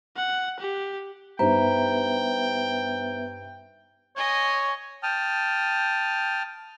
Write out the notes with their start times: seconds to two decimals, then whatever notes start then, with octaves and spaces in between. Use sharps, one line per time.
0.17 F#5
0.59 G4
1.39 G2 B3 D#4 B4 C5 E5 G5 A#5
4.16 C#5 D#5 G#5
5.03 G5 A5 D#6 F6